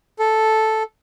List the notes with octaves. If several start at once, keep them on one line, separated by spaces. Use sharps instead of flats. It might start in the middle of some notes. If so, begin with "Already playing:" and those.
A4